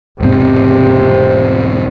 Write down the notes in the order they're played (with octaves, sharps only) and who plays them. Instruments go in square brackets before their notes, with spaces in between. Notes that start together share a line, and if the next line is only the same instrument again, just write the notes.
[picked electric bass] E1 G#2 C4 [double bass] C3